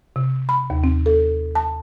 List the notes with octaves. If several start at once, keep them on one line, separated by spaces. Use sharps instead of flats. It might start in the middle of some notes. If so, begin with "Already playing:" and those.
C3
B5
D#2
C4
A4
A5